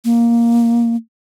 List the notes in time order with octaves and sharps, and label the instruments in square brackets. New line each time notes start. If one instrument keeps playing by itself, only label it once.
[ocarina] A#3